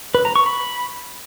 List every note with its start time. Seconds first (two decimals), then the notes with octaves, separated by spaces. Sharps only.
0.15 B4
0.25 A#5
0.36 C#6
0.46 B5